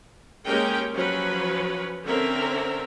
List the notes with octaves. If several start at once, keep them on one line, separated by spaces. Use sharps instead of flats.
G#3 A#3 C#4 G4 A#4 G5
F3 F#3 C#4 B4
D3 C4 C#4 A#4 E5